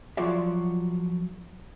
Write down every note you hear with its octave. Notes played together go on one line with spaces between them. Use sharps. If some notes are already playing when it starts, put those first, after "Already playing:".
F3 F#3 F4 F#4 D5 E5